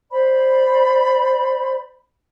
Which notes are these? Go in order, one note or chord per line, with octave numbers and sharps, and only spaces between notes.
C5 D5 B5